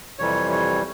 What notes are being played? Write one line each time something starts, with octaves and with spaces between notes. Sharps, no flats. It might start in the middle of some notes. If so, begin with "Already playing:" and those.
F2 C3 E3 G3 C#5
C#5